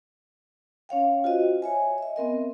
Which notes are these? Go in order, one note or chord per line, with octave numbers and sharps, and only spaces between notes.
C#4 C#5 F5 G5
F4 F#4 C5 D#5
C#5 E5 G#5
D#5 E5
B3 C4 A#4 D#5